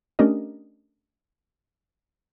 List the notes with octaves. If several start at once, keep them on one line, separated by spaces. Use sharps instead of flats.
A3 C#4 D4 G4 A#4 D#5